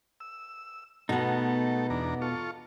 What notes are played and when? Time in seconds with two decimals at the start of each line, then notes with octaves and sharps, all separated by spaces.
0.20 E6
1.09 B2 G#3 A3 B3 D#4 A4
1.90 E2 D4 A#5
2.22 F4 A4 C#6